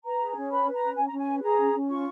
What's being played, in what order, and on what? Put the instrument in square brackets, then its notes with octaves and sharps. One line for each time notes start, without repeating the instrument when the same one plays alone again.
[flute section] B4 A#5
G#4
C#4
B4 B5
B4
A#5
C#4
C#4 G#5
C#4 A#5
G#5
B4
G#4 A#5
C#4
C#4
F4 C#6